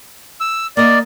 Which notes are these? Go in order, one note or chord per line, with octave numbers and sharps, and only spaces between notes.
E6
A#3 D5 D#5